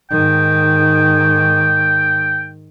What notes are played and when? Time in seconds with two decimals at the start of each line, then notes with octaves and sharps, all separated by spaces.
0.11 G#2 D#3 G5